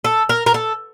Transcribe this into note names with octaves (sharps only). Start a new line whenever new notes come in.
A4
A#4
A#4
A4